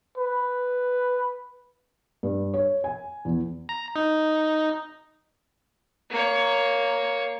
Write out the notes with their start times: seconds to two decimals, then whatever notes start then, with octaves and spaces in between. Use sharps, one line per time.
0.18 B4
2.23 G2
2.54 C#5
2.84 G#5
3.25 E2
3.69 A#5
3.96 D#4
6.10 A#3 C#5